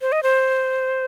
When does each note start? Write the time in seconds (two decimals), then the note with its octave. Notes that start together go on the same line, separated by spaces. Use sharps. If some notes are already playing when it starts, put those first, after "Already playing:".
0.01 C5
0.12 D#5
0.23 C5